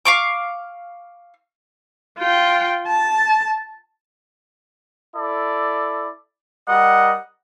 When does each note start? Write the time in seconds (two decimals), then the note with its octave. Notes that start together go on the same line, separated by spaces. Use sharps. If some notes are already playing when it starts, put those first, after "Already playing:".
0.05 F5 C#6 D6
2.19 F4 G5
2.87 A5
5.14 E4 A4 D5
6.68 G3 A#4 D#5 F#5